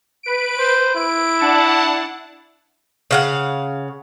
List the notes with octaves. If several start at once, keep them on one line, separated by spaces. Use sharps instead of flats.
B4 D7
C5
E4 D7
D4 F#5 A5
C#3 F5 F#5